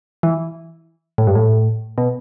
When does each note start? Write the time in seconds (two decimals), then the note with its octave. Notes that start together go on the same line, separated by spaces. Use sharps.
0.23 E3
1.18 A2
1.27 G2
1.35 A2
1.98 B2